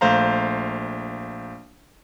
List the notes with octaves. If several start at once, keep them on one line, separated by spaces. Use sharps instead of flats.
A#1 A3 C5 F5 A#5